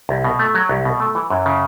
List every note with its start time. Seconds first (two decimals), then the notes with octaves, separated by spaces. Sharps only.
0.09 C2
0.24 B2
0.39 A3
0.55 F#3
0.69 C2
0.85 B2
1.00 A3
1.15 E3
1.30 F#2
1.46 C#3